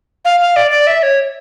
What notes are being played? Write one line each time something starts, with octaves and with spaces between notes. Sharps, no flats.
F5
F5
D5
D5
E5
C#5